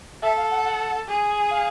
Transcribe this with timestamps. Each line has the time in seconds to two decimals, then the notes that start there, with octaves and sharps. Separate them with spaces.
0.22 A4 E5
0.37 F5
0.50 F#5
0.65 F#5
1.07 G#4
1.51 F5